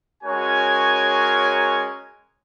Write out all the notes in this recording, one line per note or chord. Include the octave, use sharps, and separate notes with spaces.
G#3 C#4 F#4 A#4 C#5 G#5